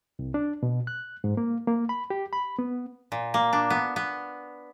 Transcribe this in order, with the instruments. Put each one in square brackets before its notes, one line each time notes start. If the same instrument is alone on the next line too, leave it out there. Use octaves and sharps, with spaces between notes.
[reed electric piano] C2
D4
B2
F#6
G#2
A#3
A#3
B5
G4
B5
B3
[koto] A#2
A#3
D4
B3
B3